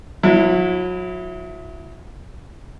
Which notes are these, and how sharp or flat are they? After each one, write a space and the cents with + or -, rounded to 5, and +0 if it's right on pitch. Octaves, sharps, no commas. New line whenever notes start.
F#3 -35 E4 +0